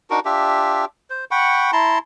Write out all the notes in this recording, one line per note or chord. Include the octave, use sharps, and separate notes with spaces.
D4 D#4 F#4 A#4
D4 F4 G4 E5
C5
F#5 G5 B5 C#6
E4 A5 A#5 C6